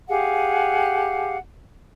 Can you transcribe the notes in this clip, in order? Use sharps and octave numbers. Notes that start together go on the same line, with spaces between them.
G4 G#4 F5 F#5